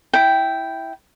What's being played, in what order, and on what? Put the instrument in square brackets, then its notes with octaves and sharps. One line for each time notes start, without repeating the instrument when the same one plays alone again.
[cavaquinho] E4 G5